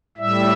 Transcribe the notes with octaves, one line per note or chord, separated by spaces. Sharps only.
A2 G3 E5